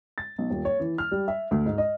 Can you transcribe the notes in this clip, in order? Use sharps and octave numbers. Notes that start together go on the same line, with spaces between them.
A6
B1
D#1
C#5
E3
F6
G3
E5
D2
G#2
D#5